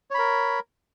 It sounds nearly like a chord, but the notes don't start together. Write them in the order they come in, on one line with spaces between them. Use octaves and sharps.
C#5 B5 A#4